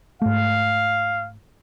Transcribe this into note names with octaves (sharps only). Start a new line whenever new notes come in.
G#2 A3 F5